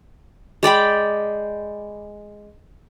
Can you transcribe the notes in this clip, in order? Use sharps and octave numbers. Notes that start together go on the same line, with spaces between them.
G#3 D5 G5 B5